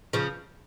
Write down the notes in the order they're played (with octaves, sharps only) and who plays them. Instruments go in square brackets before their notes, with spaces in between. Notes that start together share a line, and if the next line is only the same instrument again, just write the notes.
[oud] C#3 F3